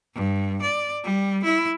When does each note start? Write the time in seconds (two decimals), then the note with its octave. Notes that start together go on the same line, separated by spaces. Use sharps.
0.15 G2
0.62 D5
1.04 G3
1.44 E4